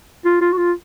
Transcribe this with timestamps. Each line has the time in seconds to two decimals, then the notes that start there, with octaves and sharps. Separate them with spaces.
0.25 F4
0.41 F4
0.52 F#4
0.57 F4